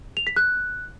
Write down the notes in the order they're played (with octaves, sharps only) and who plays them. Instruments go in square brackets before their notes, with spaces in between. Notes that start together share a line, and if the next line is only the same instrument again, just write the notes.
[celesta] F7
B6
F#6